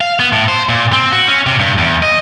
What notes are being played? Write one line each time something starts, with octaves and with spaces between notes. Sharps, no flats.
F5
B3
A2
C5
A#2
C4
F#4
C#4
C3
G2
E2
D#5